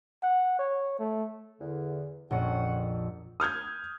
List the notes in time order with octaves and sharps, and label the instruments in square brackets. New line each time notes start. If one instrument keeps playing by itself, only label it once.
[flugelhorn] F#5
C#5
A3
[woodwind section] E2 D3
[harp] A#1 F2 [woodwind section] C#4 C#5 F#5
[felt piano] D#6 F6 G6 G#6